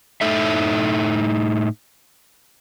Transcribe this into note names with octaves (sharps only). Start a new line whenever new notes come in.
A2 D#4 A4 E5